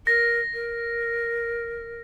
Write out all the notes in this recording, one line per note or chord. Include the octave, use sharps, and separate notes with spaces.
A#4 A#6
A#4